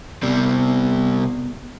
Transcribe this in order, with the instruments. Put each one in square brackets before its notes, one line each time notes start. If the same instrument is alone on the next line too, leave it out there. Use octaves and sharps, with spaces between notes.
[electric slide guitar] C3 G3 C4 [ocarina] B3